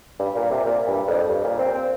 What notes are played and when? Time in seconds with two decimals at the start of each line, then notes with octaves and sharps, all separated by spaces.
0.19 G2
0.36 A#2
0.51 C3
0.66 A#2
0.87 G2
1.07 F2
1.28 G2
1.44 A#2
1.59 C4
1.75 C4